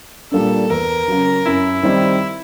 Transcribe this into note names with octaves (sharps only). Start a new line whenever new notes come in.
A#2 G3 A#3 D4 A4
E2 A#4
C#3 F#3
F#2 E4
D#3 G3 C4 D#4